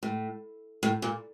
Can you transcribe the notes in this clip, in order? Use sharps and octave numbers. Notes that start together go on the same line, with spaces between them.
A2
A2
A#2